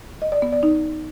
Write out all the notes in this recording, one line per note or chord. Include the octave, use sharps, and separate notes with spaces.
D#5
D5
B3
D5
D#4